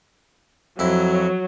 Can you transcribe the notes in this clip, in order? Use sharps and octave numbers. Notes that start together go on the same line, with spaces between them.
F2 F#3 E4